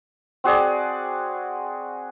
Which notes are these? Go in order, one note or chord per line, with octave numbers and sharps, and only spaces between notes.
C4 F#4 G#4 D5